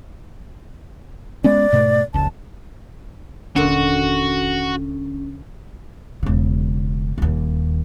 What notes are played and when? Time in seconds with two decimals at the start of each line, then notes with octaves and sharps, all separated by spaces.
1.44 G#3 B3 C#4 D5
1.73 G#2 B2 A3
2.14 F1 C#2 A5
3.56 D#1 D3 A#3 C#4 D4 F#4 C6
6.23 E1 C#3
7.18 D#1 D#2